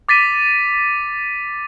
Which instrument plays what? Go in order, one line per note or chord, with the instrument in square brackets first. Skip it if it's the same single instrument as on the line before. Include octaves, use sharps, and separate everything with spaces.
[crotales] D6 A6 B6 D#7